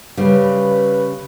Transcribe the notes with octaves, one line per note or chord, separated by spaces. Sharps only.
C#3 G3 B4